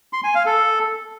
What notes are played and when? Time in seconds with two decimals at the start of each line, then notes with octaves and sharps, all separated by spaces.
0.13 C6
0.24 G#5
0.35 F5
0.46 A4